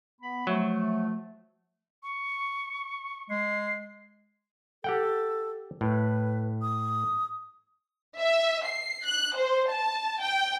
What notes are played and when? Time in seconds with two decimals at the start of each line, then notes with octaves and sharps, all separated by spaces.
0.22 B3 B5
0.47 F3 F#3 A3
2.03 C#6
3.30 G#3 C7
4.84 G4 A4 F#5 G5
5.81 A2 B4
6.62 D#6
8.18 E5
8.65 C7
9.05 F#6
9.37 C5
9.69 A5
10.21 G5